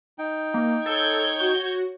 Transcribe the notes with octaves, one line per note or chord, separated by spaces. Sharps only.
D#4 G5
A#3
A4 C#5 G6 G#6
F#4